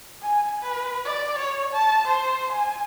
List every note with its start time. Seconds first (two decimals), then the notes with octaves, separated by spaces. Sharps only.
0.22 G#5
0.63 B4
1.05 D5
1.39 C#5
1.73 A5
2.07 C5
2.52 G#5